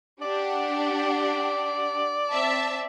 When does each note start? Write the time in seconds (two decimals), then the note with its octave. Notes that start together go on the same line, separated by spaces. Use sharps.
0.22 D4 G4 D5 F#5
2.30 C4 E5 A5